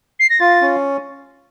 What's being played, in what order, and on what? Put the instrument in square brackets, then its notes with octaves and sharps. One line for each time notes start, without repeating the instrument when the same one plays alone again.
[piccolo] C7
A#6
[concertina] F4 [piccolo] A6
[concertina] C#4